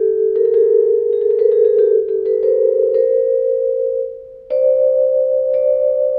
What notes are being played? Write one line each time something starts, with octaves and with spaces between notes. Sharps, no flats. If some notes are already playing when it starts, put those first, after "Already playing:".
Already playing: G4 A4
A#4
A4
G#4 A#4
G#4
A4
A#4
A4 B4
G#4 A#4
G#4 A#4
G4 A4
G4 A4
A4 B4
A#4 C5
A#4 C5
C5 D5
C5 D5